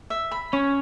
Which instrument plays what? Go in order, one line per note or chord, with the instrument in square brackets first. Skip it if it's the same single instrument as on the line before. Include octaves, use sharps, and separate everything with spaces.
[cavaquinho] E5
B5
[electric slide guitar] C#4 [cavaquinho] C#5